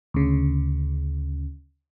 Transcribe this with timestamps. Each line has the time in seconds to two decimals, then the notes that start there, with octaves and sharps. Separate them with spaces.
0.14 D2 C#3